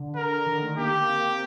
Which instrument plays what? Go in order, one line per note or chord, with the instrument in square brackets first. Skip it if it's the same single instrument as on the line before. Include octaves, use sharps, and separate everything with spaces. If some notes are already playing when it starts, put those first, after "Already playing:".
Already playing: [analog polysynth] D3
[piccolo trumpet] A#4
[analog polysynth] D#3
A3
[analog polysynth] A#3 [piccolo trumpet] G4
[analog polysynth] A#3
C4